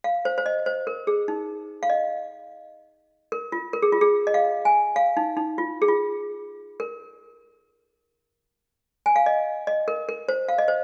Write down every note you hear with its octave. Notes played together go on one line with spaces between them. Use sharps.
F5
C5
C5
D#5
C5
A#4
G#4
D#4
F5
D#5
A#4
F4
A#4
G#4
F4
G#4
D#5
F5
G#5
F5
D#4
D#4
F4
G#4
F4
A#4
G#5
F5
D#5
D#5
A#4
A#4
C5
F5
D#5
C5